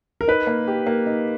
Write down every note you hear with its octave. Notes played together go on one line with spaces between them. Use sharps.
A#4
D#4 B4
A#3
G4
A#3
D#4